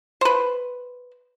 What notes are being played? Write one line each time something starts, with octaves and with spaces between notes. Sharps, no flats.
B4 C5